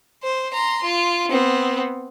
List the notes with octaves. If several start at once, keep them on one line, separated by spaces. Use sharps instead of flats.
C5
A#5 C6
F4
B3 C4